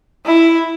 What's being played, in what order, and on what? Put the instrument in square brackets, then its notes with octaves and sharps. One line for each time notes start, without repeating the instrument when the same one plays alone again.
[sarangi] E4